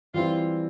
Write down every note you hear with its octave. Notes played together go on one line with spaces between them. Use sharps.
E3 G3 C4 E4 F4